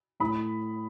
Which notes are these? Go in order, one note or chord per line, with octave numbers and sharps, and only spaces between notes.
A2 B5 D#6